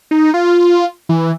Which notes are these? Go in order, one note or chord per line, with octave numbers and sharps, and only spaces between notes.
D#4
F4
E3